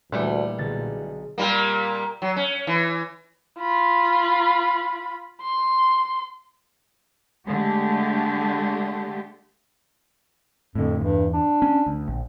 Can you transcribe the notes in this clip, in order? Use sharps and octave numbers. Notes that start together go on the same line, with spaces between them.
D2 A#2 E3 G3 A3
B1 D3 G#4 A6
A#2 G3 A#3
F#3
C#4
E3
F4 B5
C6
D3 G#3 A3 G4
F2 A2 D3
E2 G2
D4
C#4
D2
A#1